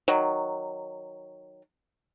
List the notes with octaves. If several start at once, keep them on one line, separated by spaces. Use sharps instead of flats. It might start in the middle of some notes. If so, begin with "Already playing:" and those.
D#3 F#3